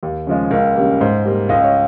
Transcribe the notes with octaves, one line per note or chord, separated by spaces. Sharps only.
D#2
C#3 F3 G#3
C#2 A#4
C#3 G3 A#3
G#2 C5
G3 A#3
C#2 D#5
C#5